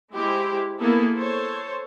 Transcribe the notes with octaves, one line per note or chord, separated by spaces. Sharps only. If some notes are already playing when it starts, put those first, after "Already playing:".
G#3 E4 G4 C5
A#3 B3 E4 G#4 A4
A4 C5 C#5